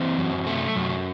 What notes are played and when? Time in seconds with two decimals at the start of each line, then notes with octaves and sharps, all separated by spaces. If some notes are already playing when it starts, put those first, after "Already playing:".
Already playing: E3 C4
0.18 F#2
0.47 A3
0.76 F#2